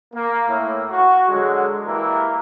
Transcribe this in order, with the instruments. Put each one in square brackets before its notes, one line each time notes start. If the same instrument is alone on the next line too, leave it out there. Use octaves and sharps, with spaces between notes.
[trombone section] A#3
A2
F#4
D3 F#3 G#3
E3 G3 A#3 E4 A#4